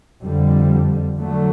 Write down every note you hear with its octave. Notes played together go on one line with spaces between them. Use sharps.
F2 D3 G3
D3 F#3 A3